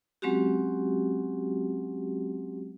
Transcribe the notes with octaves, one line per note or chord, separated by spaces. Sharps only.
F#3 G#3 C4 C#4 F#4 G4